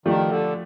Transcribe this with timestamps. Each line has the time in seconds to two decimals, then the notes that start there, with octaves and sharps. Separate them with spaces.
0.06 D#3 F3 A3 D4 G4
0.29 D3